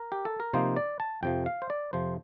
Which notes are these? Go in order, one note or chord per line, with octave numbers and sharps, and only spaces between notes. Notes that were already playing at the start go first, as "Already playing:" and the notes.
Already playing: A#4
G4
A4
A#4
C3 F3 A#3 D#4 C5
D5
A5
F2 C3 F3 G5
F5
C5
D5
F2 C3 F3 C5